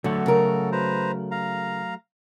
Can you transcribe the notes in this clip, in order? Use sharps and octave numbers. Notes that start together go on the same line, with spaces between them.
D3 F#3 A3 F#4 A4 F#5
C#3 A#4
B4 C5 A#5
F5 A#5